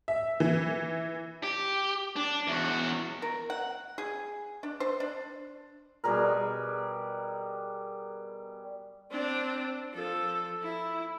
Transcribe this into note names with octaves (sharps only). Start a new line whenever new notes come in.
E5
E3
G4
D4
E2 F#4
A#4
F#5
G#4
D4
C5
D4
B2 G3 G#4 A#4
C4 D4
F3 A4
E4